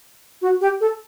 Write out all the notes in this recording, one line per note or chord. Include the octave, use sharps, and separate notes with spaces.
F#4
G4
A4